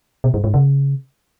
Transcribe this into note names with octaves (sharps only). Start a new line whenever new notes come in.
B2
G2
G#2
C#3